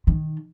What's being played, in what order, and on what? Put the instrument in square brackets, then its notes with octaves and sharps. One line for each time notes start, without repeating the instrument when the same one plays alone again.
[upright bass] D#3